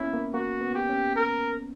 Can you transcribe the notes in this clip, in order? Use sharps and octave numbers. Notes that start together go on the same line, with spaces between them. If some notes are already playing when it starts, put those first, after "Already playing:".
Already playing: A#3 B3 C#4 E4
A#3
A#3 F#4
B3
G4
C#4
A#4